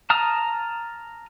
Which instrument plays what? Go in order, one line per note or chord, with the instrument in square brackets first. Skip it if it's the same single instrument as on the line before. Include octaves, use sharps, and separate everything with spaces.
[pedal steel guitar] A5 A#5 D#6 F6